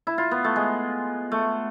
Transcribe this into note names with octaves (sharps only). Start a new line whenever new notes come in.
E4
F4
B3
A3
G#3
A3